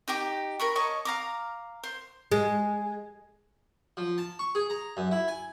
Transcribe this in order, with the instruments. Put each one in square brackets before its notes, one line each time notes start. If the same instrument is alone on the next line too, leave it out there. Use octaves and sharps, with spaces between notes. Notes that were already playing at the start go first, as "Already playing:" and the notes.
[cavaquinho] D#4 G4 G5 D6
A#4 B5 C#6
C#5 D#5 A5 C#6
F5 A#5 D6
C5
[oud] G#3
[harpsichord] F3
A5
C#6
G#4
A#5
F#2
E4
G#5